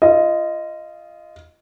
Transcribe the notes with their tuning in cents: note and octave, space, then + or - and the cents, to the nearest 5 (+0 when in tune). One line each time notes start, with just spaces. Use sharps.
F4 -25 D#5 +0